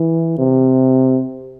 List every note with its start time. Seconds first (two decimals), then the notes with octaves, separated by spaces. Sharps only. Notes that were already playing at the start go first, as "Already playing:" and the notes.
Already playing: E3
0.38 C3